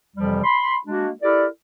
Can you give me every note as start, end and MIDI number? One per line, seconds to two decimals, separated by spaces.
0.16 0.44 41
0.16 0.44 48
0.16 0.44 52
0.16 0.44 53
0.16 0.44 55
0.44 0.76 83
0.44 0.76 84
0.87 1.10 56
0.87 1.10 58
0.87 1.10 62
0.87 1.10 66
1.23 1.46 64
1.23 1.46 67
1.23 1.46 69
1.23 1.46 70
1.23 1.46 74